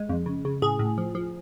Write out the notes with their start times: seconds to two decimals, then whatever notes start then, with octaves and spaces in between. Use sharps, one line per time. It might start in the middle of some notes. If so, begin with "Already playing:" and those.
Already playing: G#3
0.09 F2
0.26 C#3
0.45 C#3
0.62 A2 G#4
0.79 A2
0.98 F3
1.15 F3